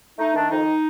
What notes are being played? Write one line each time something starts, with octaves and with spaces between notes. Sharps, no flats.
A3 D#4
D#3 D4
F2 D#4